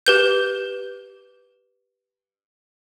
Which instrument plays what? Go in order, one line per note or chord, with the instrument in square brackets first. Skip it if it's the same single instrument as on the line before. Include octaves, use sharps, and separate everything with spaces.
[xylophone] G4 B4 G6